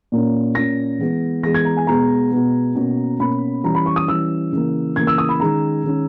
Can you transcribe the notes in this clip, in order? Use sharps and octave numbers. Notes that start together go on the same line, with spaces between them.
A#2 A#3 C#4
A#2 A#3 C#4 A#6
E3 G#3 B3
E3 G#3 B3 A#6
G#6
A#5
G#5
B2 G#3 B3 A#5
B2 G#3 B3
B2 A#3 C#4
B2 A#3 C#4 B5
E3 G3 C#4 A#5
B5
C#6
D#6
E3 G3 C#4 E6
C#3 E3 A#3
C#3 E3 A#3 G#6
E6
D#6
B5
D#3 G#3 C#4 A#5
D#3 G#3 C#4